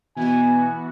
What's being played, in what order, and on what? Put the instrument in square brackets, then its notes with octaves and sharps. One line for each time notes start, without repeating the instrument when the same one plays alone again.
[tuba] B2 [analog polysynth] E3 B3 F#4 [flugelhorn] G#5